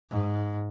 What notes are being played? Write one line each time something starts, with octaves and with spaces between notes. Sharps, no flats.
G#2